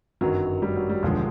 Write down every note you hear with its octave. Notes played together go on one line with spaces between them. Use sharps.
G1 F#2 D#3 F#3
G3
F#3
G3
E1 D#2 D3 F3 G#3